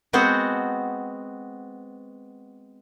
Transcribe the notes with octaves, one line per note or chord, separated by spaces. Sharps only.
G#3 B3 C4 F#4 C5 F#5